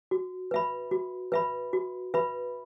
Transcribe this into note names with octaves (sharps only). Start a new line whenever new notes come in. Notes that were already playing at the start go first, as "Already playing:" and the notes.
F#4
B4 E5 B5
F#4
B4 E5 B5
F#4
B4 E5 B5